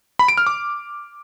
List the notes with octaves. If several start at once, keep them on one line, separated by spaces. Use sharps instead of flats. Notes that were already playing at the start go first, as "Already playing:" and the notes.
B5
D7
F6
D6